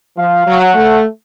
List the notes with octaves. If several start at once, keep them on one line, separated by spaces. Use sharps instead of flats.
F3 F5
F#3
F#5
A3